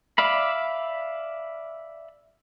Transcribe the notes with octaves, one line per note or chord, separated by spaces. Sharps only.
D5 E5 F5 B5